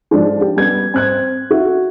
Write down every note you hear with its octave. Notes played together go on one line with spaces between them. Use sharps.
F3 G#3 D4
G4
G3 B3 G#6
C4 F#6 G#6
F#4 E5